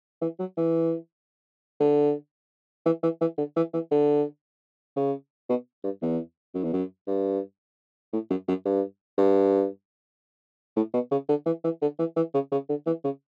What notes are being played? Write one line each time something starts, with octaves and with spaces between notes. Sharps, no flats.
E3
F#3
E3
D3
E3
E3
E3
D3
E3
E3
D3
C#3
B2
G2
E2
F#2
E2
F#2
G2
A2
F#2
F#2
G2
G2
A2
B2
C#3
D3
E3
E3
D3
E3
E3
C#3
C#3
D3
E3
C#3